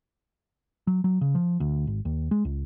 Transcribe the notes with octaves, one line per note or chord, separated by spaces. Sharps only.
F#3
F#3
C#3
F3
D2
G#1
D#2
G#3
C#2